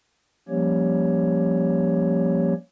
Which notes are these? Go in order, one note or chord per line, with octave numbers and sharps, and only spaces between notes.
F3 G3 A#3 C#4 G4 C#5